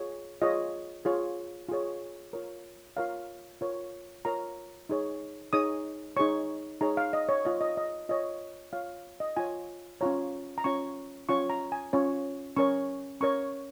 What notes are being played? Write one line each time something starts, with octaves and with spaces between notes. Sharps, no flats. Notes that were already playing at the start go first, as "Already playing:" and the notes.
Already playing: F4 G#4 C#5
F4 G#4 C#5 D#5
F4 G#4 C#5
F4 G#4 C#5
F4 A#4 C#5
F4 A#4 C#5 F5
F4 A#4 C#5
F4 A#4 C#5 A#5
D#4 G#4 C#5
D#4 G#4 C#5 D#6
D#4 G#4 C#5 C#6
D#4 G#4 C#5 A#5
F5
D#5
C#5
F4 C#5 D#5
D#5
D#5
F4 C#5 D#5
F4 C#5 F5
D#5
F4 C#5 G#5
C#4 F4 C#5 A#5
A#5
C#4 F4 C#5 C#6
C#4 F4 C#5 C#6
A#5
G#5
C#4 F4 C#5
C#4 A#4 C#5 C#6
C#4 A#4 C#5 C#6